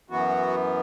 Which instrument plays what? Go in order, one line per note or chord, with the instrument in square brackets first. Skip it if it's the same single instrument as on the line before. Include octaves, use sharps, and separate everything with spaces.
[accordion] F#2 E3 B3 F#4